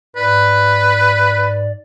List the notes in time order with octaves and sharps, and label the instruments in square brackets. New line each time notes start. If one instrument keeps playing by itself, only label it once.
[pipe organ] G#2 D5 [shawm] B4